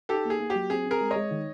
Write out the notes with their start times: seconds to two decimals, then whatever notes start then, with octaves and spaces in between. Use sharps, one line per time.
0.09 D#4 G4 A4
0.25 A#3
0.30 G#4
0.40 A#3
0.50 G4
0.55 F#3
0.70 C4 G#4
0.86 C4
0.91 G#4 A#4
1.01 G#3
1.11 G#3 C#5 D#5
1.31 D#3